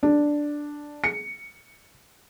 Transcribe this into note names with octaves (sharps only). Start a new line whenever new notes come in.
D4
C#7